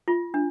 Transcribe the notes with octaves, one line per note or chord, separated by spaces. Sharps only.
F4
D4